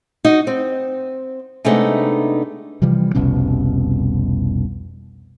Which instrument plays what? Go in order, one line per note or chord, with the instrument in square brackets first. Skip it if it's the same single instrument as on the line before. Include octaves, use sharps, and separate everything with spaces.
[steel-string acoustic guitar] D#4 F#4 D#5
C4
C3 G#3 A3 B3 D4 D#4
[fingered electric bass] C3 E3 F3 G3
F1 C2 B2 C#4